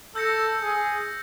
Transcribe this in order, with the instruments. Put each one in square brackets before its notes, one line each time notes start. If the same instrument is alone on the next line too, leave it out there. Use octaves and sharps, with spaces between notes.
[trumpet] A4 [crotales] E6 G6 A#6 C#7
[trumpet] G#4